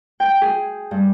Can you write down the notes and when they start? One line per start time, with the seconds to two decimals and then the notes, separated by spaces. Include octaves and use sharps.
0.20 G5
0.42 G#4
0.91 G2